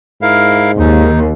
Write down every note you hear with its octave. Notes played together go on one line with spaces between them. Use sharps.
G#2 E4 A#4 F5
D#2 D#4